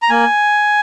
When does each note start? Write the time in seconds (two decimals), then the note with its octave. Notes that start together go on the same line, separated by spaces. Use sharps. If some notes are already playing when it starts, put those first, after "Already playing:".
0.02 A#5
0.10 A#3 G#5